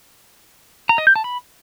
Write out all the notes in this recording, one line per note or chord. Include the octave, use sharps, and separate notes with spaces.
A#5
D#5
G6
A5
B5